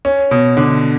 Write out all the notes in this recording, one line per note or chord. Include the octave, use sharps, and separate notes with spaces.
C#4
B2
D3